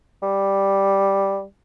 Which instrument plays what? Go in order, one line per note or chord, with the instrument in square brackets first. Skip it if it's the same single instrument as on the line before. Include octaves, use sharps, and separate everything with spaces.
[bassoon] G3